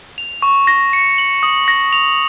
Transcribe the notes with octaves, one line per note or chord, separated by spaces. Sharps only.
F7
C#6
A#6
C#7
F#7
D#6
A#6
F7